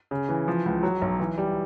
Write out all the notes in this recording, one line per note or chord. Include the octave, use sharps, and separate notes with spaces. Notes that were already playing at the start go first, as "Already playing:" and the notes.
C#3
E3
F3
C#2
F#3
B1
E3
G3